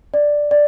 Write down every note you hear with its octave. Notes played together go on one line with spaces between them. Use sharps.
D5
D5